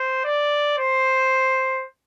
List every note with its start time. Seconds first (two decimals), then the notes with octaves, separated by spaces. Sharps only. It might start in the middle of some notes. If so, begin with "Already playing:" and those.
Already playing: C5
0.25 D5
0.78 C5